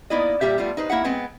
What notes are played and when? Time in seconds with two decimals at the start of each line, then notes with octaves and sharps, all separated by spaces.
0.10 A#3 B3 D#4 E4 D5 D#5
0.41 A#2 G3 G4 E5
0.58 G3 A3 B3 F4
0.77 D#4 B4 C5
0.90 A#3 E4 E5 F#5
1.04 G#3 B3 C4 G#5